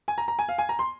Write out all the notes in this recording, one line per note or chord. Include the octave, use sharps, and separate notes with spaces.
G#5
A#5
A#5
G#5
F5
G#5
A#5
C6